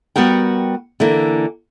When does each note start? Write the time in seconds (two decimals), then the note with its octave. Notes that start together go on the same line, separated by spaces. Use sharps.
0.16 G3 B3 F#4 A#4 G5
1.00 D3 E3 A#3